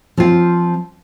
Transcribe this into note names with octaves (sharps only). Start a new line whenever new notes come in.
F3 C4 F4